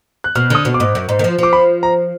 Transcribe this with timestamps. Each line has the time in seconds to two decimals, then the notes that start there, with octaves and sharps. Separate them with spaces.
0.24 F#6
0.35 B2 F6
0.50 D3 D#6
0.65 B2
0.74 D6
0.80 G#2
0.95 F#2
1.09 G#2
1.19 D#3
1.24 F3
1.38 F3 D6
1.53 B5
1.83 A#5